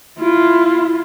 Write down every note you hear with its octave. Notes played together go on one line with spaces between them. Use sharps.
E4 F4